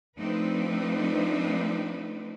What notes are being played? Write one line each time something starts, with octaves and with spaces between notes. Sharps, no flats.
F3 A3 C4 D4 D#4 B4